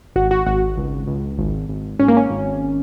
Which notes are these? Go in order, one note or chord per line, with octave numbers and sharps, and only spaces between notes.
G#1 F#4
F#4
G#1 F#4
C#2
C#2
G#1
G#1
G#1 C#4
A#3
C#4
G#1